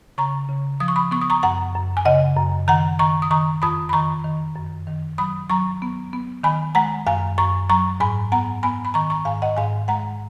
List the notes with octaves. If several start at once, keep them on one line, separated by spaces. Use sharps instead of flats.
C#3 A#5 C#6
C#3
F3 D#6
C#6
B5 D#6
B3 C#6
D#6
A#5 C#6
F#2 F#5 A#5
F#2
G#5
C#3 D#5 F#5
F#2
D#3 F#5 A#5
D#3 A#5 C#6
D#6
D#3 A#5 C#6
F2 B5 D#6
B5
D#3 A#5 C#6
D#3
F#2
D#3
F#3 B5 D#6
F#3 A#5 C#6
B3
B3
D#3 G#5 B5
G#3 F#5 A#5
F#2 F5 G#5
F#2 A#5 C#6
F#3 A#5 C#6
G#2 G#5 B5
B3 F#5 A#5
B3 G#5 B5
B5
D#3 A#5 C#6
A#5 C#6
G#2 F5 G#5
D#5 F#5
G#2 F5 G#5
G#3 F#5 A#5